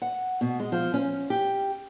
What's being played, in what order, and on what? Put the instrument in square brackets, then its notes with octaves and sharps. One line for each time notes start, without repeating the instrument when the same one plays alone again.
[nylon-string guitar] F#5
B2
G#3
F3
C#4
G4